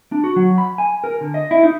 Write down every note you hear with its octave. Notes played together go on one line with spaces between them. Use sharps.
D4
F#4
F#3
B5
G#5
A#4
D3
D#5
E4
D#4